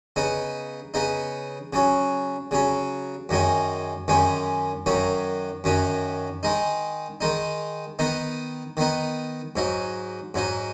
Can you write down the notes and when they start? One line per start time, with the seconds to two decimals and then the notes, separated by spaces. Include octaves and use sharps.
0.16 C#3 B3 D#4
0.94 C#3 B3 D#4
1.73 C#3 F#3 C#4
2.51 C#3 F#3 C#4
3.29 F#2 D#3 G#3 C#4
4.08 F#2 D#3 G#3 C#4
4.86 F#2 D#3 F#3 C#4
5.64 F#2 D#3 F#3 C#4
6.43 D#3 G#3 D#4
7.21 D#3 G#3 D#4
7.99 D#3 B3 D#4
8.77 D#3 B3 D#4
9.56 G#2 F#3 D#4
10.34 G#2 F#3 D#4